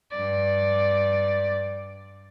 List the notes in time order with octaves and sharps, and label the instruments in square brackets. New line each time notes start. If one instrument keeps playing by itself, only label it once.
[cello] G2 D5